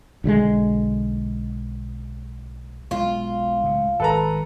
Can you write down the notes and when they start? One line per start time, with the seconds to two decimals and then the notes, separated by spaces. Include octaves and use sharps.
0.24 B1 D3 G3 G#3
2.91 B1 G#3 F4
3.64 C#2 A2
4.00 G#1 A4 B4 A#5